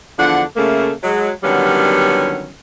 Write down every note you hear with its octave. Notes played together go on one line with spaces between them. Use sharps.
E2 D3 F3 D4 F#5
C#3 A3 A#3
F#3 G#3
D3 D#3 F#3 G3 B3 C#4